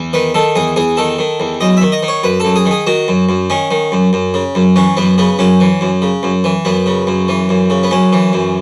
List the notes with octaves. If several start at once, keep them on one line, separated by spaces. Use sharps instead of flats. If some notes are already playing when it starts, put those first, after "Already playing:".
Already playing: E2
D#3 B4
D#3 A4
E2 G#4
E2 G#4
D#3 A4
D#3
E2
F#2 D#5
D#3 E5
D#5
D#3
C#5
F#2 B4
F#2 A4
G#4
D#3
G#4
D#3 F#4
F#2
F#2
D#3 C#4
D#3
F#2
F#2
C#3
F#2
E3 C#4
F#2 B3
C#3 B3
F#2 C#4
E3
F#2
C#3
F#2
E3
F#2 B3
C#3
F#2
E3
F#2
C#3
B3
F#2 C#4
E3
F#2